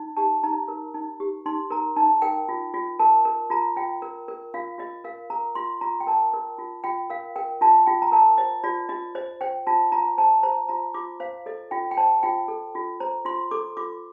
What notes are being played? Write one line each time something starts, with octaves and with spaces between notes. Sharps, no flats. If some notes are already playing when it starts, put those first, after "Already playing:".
Already playing: D#4
G4 A5
D#4 A#5
A#4
D#4
G4
D#4 C6
A#4 A#5
D#4 A5
A#4 G5
F4
F4
A#4 A5
A#4
F4 A#5
F4 G5
A#4
A#4
F4 F5
F4 D#5
A#4 F5
A#4 A#5
F4 C6
F4 A#5
G5
A#4 A5
A#4
F4
F4 G5
A#4 F5
A#4 G5
F4 A5
F4 G5
A#5
A#4 A5
C5 D#5
F4 D5
F4 D#5
C5 D#5
C5 G5
F4 A5
F4 A#5
C5 A5
C5 A#5
F4 A#5
F4 D6
C5 F5
A4 D#5
F4 G5
G5
C5 A5
F4 G5
A4
F4
C5 A#5
F4 C6
A4 D6
F4 D6